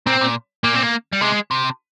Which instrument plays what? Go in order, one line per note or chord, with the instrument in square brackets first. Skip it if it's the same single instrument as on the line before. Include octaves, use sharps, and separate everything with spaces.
[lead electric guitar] A#2 [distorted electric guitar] C4
[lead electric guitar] A#2
[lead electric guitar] A#2 [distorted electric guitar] A#3
[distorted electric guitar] C4
A#3
G3
[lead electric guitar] C3 [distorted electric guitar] G#3
[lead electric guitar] C3